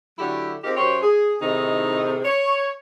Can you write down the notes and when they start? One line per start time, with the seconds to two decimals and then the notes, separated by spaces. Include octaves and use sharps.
0.19 D3 F#3 A3 E4 G4
0.64 C4 D#4 F4 G4 G#4 A#4
0.77 F#2 G4 C5 C#5
1.02 G#4
1.40 A2 C3 D#3 D#4 G#4 A4
2.24 C#5